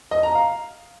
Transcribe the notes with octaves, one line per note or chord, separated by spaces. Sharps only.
D#5
A#5
F5